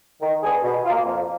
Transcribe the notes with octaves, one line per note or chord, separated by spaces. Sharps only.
D#3
G#3 B3 D4 G#4
B2
F4
A#3
F2